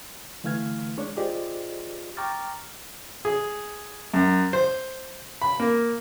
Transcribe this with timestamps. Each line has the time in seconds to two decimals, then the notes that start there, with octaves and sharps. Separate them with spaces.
0.44 D3 E3 A3 F5 F6 G#6
0.97 G#3 D4 C#5
1.17 F4 G4 G#4 C5 D5 D#5
2.17 G5 A#5 C#6 D6 F6 A6
3.25 G#4
4.14 F#2
4.53 C5
5.42 B5
5.60 A#3